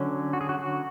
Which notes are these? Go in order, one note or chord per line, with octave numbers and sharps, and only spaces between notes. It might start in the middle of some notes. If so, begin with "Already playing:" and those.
Already playing: D3 F#3 C#4
F#4
G#4
F#4
F#4